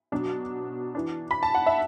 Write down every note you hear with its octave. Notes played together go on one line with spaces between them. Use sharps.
B2 F#3 D4
E3 D4
B5
A5
F#5
E5